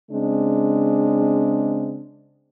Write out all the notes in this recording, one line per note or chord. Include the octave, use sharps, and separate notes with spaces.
C#3 G#3 C4 D4